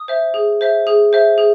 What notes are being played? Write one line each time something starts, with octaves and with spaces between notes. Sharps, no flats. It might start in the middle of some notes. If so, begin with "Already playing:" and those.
Already playing: D#6
C5 E5
G#4
C5 E5
G#4
C5 E5
G#4